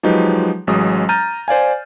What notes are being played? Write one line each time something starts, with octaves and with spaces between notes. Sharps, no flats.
F3 F#3 G#3 D#4 G4 B4
A1 F#3 G#3 D#6
A#5 F6 G6 A6 D#7
C5 D5 F5 G#5